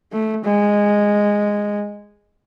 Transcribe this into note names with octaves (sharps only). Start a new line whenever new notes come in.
A3
G#3